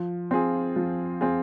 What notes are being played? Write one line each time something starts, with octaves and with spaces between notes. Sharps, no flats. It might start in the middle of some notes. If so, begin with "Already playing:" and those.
Already playing: F3
C4 F4 G#4
F3
C4 F4 G#4